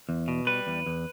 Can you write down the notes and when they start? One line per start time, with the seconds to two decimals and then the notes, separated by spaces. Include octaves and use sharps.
0.09 E2
0.28 B2
0.47 G3 B4
0.67 E2
0.86 E2